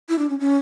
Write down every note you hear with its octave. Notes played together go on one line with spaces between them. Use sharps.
E4
D4
C#4
C#4